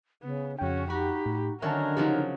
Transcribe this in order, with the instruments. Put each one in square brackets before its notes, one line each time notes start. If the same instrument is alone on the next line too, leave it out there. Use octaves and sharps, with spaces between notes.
[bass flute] C#3 [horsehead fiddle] B3
[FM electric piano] F2 G5 [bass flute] C#3 [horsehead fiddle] C#4 F#4
[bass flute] D#4 [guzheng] F#4 [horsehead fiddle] G4 B5
[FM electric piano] A2
[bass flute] D3 [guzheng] D#3 F#3 C#4 [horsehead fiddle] D4 A#4 [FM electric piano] E5 A5
[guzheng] C#3 F3 F#3 [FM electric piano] D#4 G4